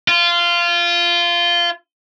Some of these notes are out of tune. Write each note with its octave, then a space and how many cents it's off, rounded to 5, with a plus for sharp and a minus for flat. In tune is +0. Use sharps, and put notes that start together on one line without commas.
F4 -15